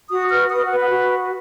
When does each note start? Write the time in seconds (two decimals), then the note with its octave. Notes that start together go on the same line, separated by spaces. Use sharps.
0.09 F#4 D#6
0.30 B4 F6
0.50 B4 D#6
0.66 F#5
0.71 B4
0.80 F#5
0.90 F#4